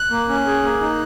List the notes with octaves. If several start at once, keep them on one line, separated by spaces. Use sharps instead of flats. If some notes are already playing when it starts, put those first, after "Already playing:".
Already playing: F#6
A#3
C#4
G#4
A#3
D#4